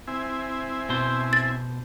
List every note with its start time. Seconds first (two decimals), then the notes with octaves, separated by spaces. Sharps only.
0.08 C4 E4 G#5
0.89 B2 C5
1.33 A6